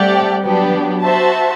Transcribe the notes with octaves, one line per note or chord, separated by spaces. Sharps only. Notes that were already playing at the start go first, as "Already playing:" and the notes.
Already playing: G3 A3 C4 G4 D5 F#5
F#3 B3 D4 G4
F#3
F#4 C5 E5 A5